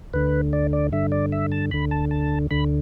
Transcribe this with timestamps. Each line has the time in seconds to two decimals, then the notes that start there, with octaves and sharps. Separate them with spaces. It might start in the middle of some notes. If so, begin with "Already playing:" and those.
0.14 D2 D3 B4
0.53 D5
0.73 D5
0.92 G2 D3 E5
1.12 D5
1.32 E5
1.52 A5
1.71 D2 D3 B5
1.91 A5
2.11 A5
2.51 D2 D3 B5